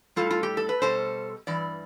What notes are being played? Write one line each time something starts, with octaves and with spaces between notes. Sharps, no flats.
A2 G3 F4 A4
F4
G4
A4
B4
B2 G3 A4 C5
G2 E3 D5